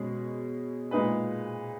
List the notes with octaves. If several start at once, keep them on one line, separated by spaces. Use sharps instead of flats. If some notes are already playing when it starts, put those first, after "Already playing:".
Already playing: B2 G#3 C#4 G#4
A#2 G#3 D#4 G#4 B4